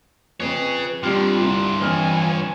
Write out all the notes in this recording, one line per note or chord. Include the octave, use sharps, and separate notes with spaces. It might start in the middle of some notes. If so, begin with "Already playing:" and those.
F2 G#4 B4 C#5
G2 D3 G3 C4 F4 G4 F6
C2 C6
F2 E3 C#5 G#5 F6